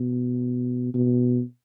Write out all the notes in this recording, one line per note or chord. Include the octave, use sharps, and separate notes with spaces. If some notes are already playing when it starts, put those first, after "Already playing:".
Already playing: B2
B2